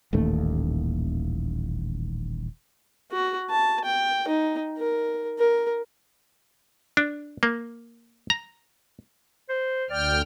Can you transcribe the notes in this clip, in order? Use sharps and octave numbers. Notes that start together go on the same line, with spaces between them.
D#1 A1 D#2 A3
F#4
A5
G5
D#4
A#4
A#4
D4
A#3
A#5
C5
D2 D5 G5 F6